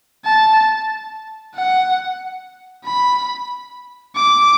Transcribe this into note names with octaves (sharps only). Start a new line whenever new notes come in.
A5
F#5
B5
D6